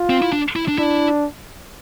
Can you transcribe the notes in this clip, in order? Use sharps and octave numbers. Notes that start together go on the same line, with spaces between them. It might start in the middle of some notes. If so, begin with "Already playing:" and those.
Already playing: F4
C4
E4
D4
E4
D4
D4 E4